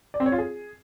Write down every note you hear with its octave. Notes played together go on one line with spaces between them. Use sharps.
D5
C4
C#5
F4
G#4